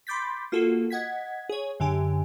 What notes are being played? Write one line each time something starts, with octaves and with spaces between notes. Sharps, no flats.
B5 C6 D6 G6 A6 B6
A#3 F4 F#4 A4
D#5 F#5 G#6 B6
G#4 C#5
F#2 D3 G4 G#5